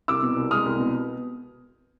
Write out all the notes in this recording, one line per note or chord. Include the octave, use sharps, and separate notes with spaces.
C2 D6 E6
B2
C2
G#3 D#6 F6
C2
B2